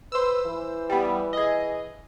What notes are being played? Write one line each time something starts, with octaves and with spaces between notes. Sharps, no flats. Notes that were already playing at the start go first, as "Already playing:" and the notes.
B4 C5 E6
E3
G3 B3
G#4 D#5